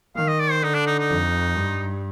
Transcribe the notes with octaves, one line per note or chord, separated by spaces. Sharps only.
D#3 F5
D#5
D5
C5
D3 D#4
D4
D#4
D#4
F2
G2